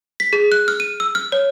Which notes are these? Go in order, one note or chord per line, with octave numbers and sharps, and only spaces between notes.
B6
G#4
F#6
F6
D#7
E6
F6
C#5